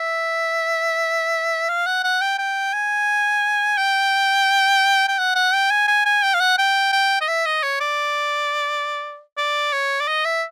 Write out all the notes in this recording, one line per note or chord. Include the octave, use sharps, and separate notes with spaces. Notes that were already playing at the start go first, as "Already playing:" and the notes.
Already playing: E5
F5
F#5
F#5
G5
G5
G#5
G5
G5
F#5
F#5
G5
G#5
G#5
G#5
G5
F5
F#5
G5
G5
D#5
E5
D#5
C#5
D5
D5
C#5
D5
D#5
E5